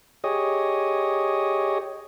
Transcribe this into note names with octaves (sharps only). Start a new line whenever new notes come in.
G4 G#4 C#5 D#5